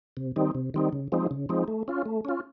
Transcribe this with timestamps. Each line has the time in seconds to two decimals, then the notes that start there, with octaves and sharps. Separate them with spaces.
0.17 C3
0.36 D#3 G3 C4 D#4
0.55 C3
0.74 D#3 G3 C4 D#4
0.93 C#3
1.12 F3 G#3 C4 D#4
1.31 C#3
1.49 F3 G#3 C4 D#4
1.68 A3
1.88 C#4 F4
2.06 A3
2.25 C#4 F4